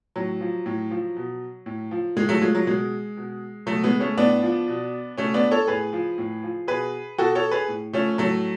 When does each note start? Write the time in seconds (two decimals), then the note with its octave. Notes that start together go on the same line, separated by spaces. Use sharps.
0.16 A2 F#3
0.41 F3
0.66 A2
0.91 F3
1.16 B2
1.66 A2
1.91 F3
2.16 A2 G#3
2.29 F#3 A3
2.41 F3 G#3
2.55 F#3
2.66 B2 G#3
3.17 B2
3.67 B2 F#3 A3
3.84 G#3 B3
4.00 A3 C#4
4.17 A2 B3 D4
4.43 F3
4.68 B2
5.17 B2 A3 C#4
5.34 B3 D4
5.51 A4 C#5
5.67 A2 G#4 B4
5.93 F3
6.18 A2
6.43 F3
6.68 B2 G#4 B4
7.18 B2 F#4 A4
7.35 A4 C#5
7.51 G#4 B4
7.68 A2
7.93 F3 A3 C#4
8.18 A2 F#3 A3